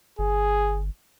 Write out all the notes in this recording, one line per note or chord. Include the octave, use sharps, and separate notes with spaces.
G1 G#4